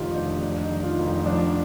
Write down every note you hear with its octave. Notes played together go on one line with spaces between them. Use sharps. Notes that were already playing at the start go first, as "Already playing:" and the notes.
Already playing: F1 D3 D#3 F4 G4
D#4
F1 D4
F1 D4
D#4
D#3
F4
F1
D#4
F3 D4